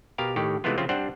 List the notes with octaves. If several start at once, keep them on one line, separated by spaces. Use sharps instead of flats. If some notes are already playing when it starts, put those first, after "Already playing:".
B2 G4 A#4 F5
A2 D#3 G4
C3 E3 G#3 A3 B3 F4
C#3 F3 C4 F4
G3 C4 D4 C5 F#5